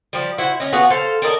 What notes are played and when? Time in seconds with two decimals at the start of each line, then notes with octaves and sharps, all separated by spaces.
0.13 F3 G3
0.38 E4 F#4 C5
0.60 C#4 D#5
0.73 B3 F4 F#4 G#4
0.90 A4 C5 F5
1.22 A#4 D5 D#5 A5